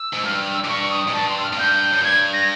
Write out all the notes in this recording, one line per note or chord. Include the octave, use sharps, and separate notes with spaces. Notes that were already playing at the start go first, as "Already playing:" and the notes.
Already playing: E6
G#2
G2 F6
E6
G#2 D6
G2 C#6
D#6
G#2
G2 A5
C6
E6
F6
G#2
G2 G6
F#2
G2 G#6
A#6